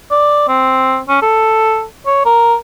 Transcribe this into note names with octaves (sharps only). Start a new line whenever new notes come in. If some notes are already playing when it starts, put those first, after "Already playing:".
D5
C4
C#4
A4
C#5
A#4